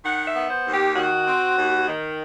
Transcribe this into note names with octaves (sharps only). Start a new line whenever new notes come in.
D#3 F#5
E5
B3
C5
D#2
G4
D#3 F#4
C4
D#2
D#3